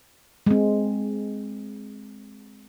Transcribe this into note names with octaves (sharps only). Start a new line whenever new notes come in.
G#3 C4